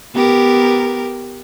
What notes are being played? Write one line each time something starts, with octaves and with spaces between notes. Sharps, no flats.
B3 G4 A#4